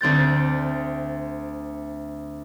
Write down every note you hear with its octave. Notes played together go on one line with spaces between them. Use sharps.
D2 C4 G6 A6